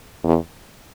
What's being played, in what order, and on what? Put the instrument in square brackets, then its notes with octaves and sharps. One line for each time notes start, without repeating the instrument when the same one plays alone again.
[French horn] E2